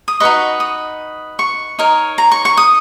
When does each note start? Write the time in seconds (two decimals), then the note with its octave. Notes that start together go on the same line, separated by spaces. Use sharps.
0.08 D#6
0.20 D#4 F#4 B4 D#5 C#6
0.60 D#6
1.39 C#6
1.79 D#4 A#4 C#5
2.18 A#5
2.31 C#6
2.45 C#6
2.57 D#6